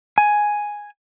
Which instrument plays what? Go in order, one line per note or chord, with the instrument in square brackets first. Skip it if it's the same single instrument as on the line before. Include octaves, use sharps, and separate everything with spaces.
[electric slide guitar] G#5